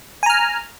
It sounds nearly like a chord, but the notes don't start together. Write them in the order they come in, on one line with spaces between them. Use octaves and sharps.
G#5 A#5 F6